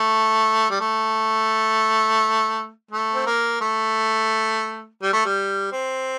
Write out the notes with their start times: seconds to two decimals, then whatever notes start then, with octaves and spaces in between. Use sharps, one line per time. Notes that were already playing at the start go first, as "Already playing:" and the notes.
Already playing: A3
0.70 G3
0.80 A3
2.91 A3
3.14 C4
3.26 A#3
3.61 A3
5.03 G3
5.13 A3
5.25 G3
5.72 C4